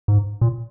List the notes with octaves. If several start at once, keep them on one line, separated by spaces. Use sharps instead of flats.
G#2
A#2